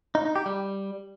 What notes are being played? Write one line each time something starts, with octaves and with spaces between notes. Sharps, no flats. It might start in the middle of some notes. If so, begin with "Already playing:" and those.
D#4
D#4
G4
G3